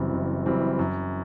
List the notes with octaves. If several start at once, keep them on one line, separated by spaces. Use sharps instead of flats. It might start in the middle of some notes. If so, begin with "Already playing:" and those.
Already playing: F#1 F#2 E3 G3 C4
F#1
F#2 E3 G3 C4
F#2